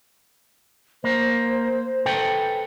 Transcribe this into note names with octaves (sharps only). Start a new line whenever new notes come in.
A#3 C5
A4 B4 G5